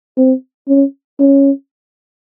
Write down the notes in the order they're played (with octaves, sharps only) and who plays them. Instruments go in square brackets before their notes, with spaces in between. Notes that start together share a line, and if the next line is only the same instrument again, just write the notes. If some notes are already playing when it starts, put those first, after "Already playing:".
[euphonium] C4
C#4
C#4